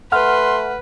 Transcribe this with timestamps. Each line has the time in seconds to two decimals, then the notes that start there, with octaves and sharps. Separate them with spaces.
0.12 A3 B4 F#5 C6 F6